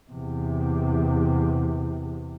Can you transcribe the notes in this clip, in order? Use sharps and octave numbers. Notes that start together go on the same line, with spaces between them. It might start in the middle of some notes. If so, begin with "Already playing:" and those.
E2 C3